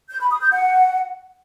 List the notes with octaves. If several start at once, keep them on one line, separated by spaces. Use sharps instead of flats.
G6
B5
D#6
G6
F#5